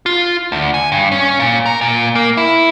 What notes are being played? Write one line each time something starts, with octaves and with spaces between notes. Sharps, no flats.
F4
D2
G#5
G2
C#4
A#2
A#4
A#2
A#3
E4